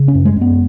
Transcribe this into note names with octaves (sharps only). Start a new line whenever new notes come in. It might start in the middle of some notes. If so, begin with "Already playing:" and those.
Already playing: C#3
C#4
F#2
G#3
F#2 B3